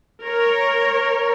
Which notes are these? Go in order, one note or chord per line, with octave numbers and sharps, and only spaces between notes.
A#4 C#5